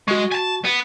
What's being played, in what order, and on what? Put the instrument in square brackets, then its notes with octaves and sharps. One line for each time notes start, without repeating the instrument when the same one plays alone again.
[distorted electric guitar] G#3 [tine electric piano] F#4 C#6
[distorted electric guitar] G#5 A5
B3